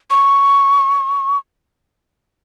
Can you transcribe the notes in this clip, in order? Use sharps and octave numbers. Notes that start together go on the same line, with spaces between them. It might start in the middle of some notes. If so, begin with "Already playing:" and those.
C#6